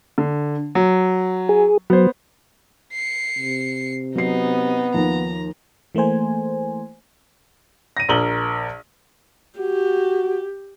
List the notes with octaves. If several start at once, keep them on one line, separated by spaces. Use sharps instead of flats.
D3
F#3
G#4
F#3 B3 C5
C7 C#7
C3
F#3 B3 D#4 C7
D#2 F3 A#5
E3 A3 A#3 C5 G#5
A#6 D#7
A#1 A#4 F#7 G7
F#4 G4